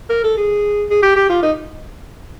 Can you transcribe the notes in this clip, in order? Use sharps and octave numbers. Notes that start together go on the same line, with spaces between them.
A#4
A4
G#4
G#4
G4
G4
F4
D#4